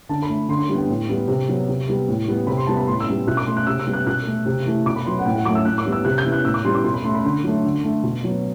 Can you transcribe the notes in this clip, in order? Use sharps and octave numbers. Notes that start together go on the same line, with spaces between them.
D3 A5
B5
A3
D3 C6
C6
G3 B3
G5
A2
E3 G3 B3
C3
F#3 B3
C3
G3 B3
A2
G3 B3
C3 B5
C6
G3 B3 A5
B5
A2 C6
E6
G3 B3
B2 F#6
D6
A3 C6
F#6
C3 E6
E6
G3 B3
F#6
B2 F#6
A3
C3
E3 A3
B2 D6
B5
F#3 B3 C6
F#5
A2 G5
F#5
F#3 A3 D6
E6
A2 F#6
D6
E3 G3 B3
E6
C3 F#6
G6
E3 B3
F#6
A2 E6
D6
E3 G3 B3 C6
D6
B2 C6
B5
A3 C6
B5
D3 C6
F#3 A3
D3
A3
B2
F#3 B3